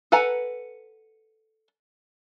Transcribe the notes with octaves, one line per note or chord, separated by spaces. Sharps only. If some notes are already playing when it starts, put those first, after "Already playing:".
A4 B4 F#5 G#5 A#5